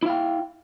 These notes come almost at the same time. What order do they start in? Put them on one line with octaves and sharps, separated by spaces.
E4 F5 G5